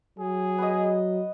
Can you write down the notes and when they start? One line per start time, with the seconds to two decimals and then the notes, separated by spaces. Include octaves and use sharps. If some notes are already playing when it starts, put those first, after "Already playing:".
0.19 F#3 G#4
0.58 B3 D#5